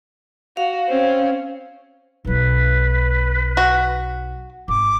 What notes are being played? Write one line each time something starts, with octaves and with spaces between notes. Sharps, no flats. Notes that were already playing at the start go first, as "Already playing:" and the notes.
F#4 F5
C4 C#4
B1 F#3 B4
F#4
G#1 D6